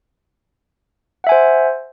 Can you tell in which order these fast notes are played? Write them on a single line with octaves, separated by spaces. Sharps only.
F#5 E5 G#5 C5